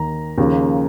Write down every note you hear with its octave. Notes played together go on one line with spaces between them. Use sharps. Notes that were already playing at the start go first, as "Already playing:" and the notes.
Already playing: D#2 D#3 A#5
D#2 C#3 F3